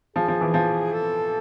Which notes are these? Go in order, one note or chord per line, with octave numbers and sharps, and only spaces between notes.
F3 G#4
F3
E3
F3
A4